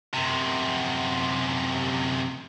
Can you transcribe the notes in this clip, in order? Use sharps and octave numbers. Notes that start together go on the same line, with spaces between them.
F#2 C3